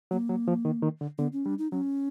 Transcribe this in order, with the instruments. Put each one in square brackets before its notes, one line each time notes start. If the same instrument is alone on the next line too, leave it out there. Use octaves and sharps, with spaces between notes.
[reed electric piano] F#3 [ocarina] A#3
[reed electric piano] F#3
F3
D#3
D#3
D3
[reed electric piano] D3 [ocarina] B3
[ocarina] C#4
[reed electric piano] G3 [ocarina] D4
[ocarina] D#4
[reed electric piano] F#3 [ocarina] C#4